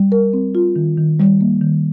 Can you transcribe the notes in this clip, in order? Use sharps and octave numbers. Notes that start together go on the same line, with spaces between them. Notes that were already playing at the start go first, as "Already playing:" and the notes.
Already playing: G3
A#4
C4
F4
D#3
D#3
G3
A#3
D#3